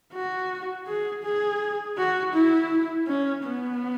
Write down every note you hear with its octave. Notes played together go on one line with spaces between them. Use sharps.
F#4
G#4
G#4
F#4
E4
C#4
B3